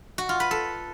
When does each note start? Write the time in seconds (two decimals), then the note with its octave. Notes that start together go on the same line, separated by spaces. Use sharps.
0.18 F#4
0.29 F4
0.40 B4
0.51 A4